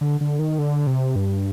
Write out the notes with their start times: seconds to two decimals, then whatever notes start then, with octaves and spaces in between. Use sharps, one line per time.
0.01 D3
0.21 D3
0.39 D#3
0.59 D3
0.87 C3
1.16 G2